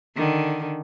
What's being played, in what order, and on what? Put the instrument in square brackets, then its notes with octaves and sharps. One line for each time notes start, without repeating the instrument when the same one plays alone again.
[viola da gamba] D3 D#3